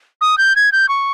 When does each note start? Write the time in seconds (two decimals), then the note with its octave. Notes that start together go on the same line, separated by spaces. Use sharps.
0.21 D#6
0.38 G6
0.56 G#6
0.72 G6
0.89 C#6